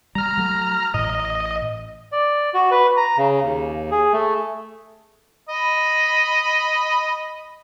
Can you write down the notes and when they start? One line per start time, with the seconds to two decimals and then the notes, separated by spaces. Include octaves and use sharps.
0.15 G3 A#5 F6
0.38 F#3 A3
0.94 A1 A2 D#5
2.12 D5
2.54 F#4
2.71 B4
2.97 A#5
3.18 C#3
3.43 D#2
3.91 G#4
4.13 A3
5.49 D#5 B5